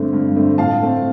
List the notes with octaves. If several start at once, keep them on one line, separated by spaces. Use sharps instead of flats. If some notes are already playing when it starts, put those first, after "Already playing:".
Already playing: G2 D3 A3 C4
G2
D3 A3 C4
A2 F5 A5
A3 C4